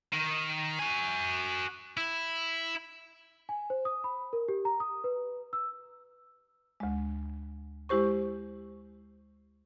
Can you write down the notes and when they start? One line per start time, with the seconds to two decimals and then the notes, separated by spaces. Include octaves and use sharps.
0.13 D#3
0.79 F#4 G#5
1.97 E4
3.49 G#5
3.70 C5
3.85 D#6
4.04 B5
4.33 A#4
4.48 G4
4.65 A#5
4.80 D#6
5.04 B4
5.53 E6
6.80 D2 G#3
7.89 G#3 E4 G4 C5 C#6